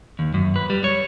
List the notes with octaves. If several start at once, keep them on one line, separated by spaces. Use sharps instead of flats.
D#2
F#2
B4
G3
C#5